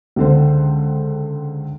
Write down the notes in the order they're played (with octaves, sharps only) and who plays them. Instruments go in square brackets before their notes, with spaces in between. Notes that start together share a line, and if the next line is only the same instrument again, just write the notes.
[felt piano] C#2 D3 C5